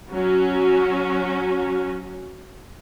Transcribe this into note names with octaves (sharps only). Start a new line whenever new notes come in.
F#3 C#4 F#4